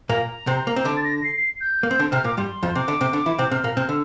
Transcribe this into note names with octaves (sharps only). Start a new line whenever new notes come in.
A#2 A#3 A#5
C3 C4
A#3
C4
D3 D4 D6
A6
A#6
C7
C7
G6
A#3
C4
D3 D4
C3 C4 F6
A#2 A#3 D6
G2 G3 C6
F2 F3
C3 C4 D6
D3 D4
C3 C4
D3 D4
E3 E4
C3 C4
C3 C4 F6
A#2 A#3
C3 C4
D3 E6